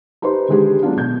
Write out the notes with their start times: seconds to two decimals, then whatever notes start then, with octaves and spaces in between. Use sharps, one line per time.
0.22 D#4 G4 B4 C5 C6
0.48 D3 D#3 G#3 G4 G#4
0.83 F#3 B3 D4 F4
0.96 B2 G6 G#6